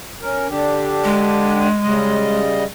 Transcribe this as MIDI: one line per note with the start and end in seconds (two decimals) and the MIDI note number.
0.21 0.47 61
0.21 0.47 70
0.48 1.68 50
0.48 1.68 62
0.48 1.68 67
1.04 2.40 56
1.82 2.64 49
1.82 2.64 55
1.82 2.64 75